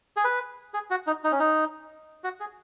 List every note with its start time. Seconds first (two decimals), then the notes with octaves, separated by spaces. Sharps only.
0.17 G#4
0.24 B4
0.74 G#4
0.91 F#4
1.07 D#4
1.24 D#4
1.32 C#4
1.39 D#4
2.24 F#4
2.40 G#4